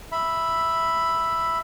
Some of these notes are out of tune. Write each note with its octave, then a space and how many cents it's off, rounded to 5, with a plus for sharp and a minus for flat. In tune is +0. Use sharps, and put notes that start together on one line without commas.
E5 +0 B5 +0